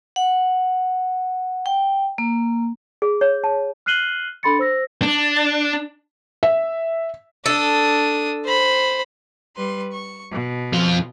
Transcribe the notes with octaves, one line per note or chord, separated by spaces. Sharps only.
F#5
G5
A#3
G#4
C#5
A5
F6 F#6 C7 D#7 F#7 G7
D4 A4 B5 C6 A6 C#7
C5 E6 A#6
D4
E5
D4 A4 D#6
C5 B5
G3 B4 C6
C#6
B2
F2 F4